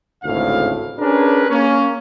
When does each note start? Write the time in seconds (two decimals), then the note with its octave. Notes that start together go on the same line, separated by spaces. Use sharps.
0.23 G#1 D2 A2 C#3 F5
0.99 C#4 D4 G4 G#4 A#4 B4
1.50 A#3 C#4